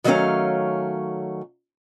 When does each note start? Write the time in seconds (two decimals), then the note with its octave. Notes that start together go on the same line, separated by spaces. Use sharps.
0.04 D#3 F#3 A3 A#3 C#4 F5